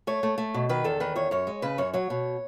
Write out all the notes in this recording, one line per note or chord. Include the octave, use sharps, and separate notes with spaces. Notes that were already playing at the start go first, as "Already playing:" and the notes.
A3 C#5
A3
A3
B2
D#3 B4
E2 A4
D#3 B4
E2 C#5
F#2 C#5
G#3
C#3 B4
F#2 C#5
F#3 C#5
B2